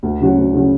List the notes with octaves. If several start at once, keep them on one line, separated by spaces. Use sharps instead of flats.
D2
C#3 F#3 C#4 F#4
D2
C#3 F#3 C#4 F#4